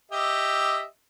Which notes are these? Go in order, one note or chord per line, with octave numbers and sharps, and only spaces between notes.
G4 D#5 E5